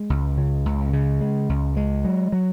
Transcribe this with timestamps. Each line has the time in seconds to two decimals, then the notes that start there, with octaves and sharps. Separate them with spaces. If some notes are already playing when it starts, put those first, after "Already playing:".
Already playing: G#3
0.10 C#2
0.37 C#3
0.66 C#2
0.93 C#3
1.21 G#3
1.49 C#2
1.77 G#3
2.04 F#3
2.32 F#3